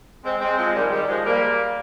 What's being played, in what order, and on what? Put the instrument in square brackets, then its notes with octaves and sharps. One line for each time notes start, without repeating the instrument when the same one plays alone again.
[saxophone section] G#3 C4
G#3 C4
F3 G#3
D#3 G3
D#3 G3
F3 G#3
G3 A#3